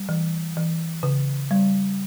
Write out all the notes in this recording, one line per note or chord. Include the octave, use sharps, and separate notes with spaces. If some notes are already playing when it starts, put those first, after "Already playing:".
Already playing: G3
E3
E3
C#3
G3